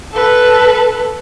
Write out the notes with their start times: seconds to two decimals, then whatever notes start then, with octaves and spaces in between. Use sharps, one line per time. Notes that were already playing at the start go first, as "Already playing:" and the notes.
0.12 A4 B4